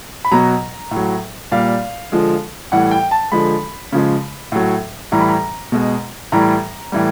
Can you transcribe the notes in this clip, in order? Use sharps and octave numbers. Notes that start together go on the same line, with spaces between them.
B5
B2 F#3 A#5
A2
F#3
A#2 G3 F5
D3 F3 G#3
A2 E3 G3 F#5
G5
A5
D3 F3 G#3 B5
C#3 F3 G#3
A2 F#3
A2 E3 G3 A#5
B5
A#5
B2 G#3
A2 E3 G3 A#5
A2 E3 G3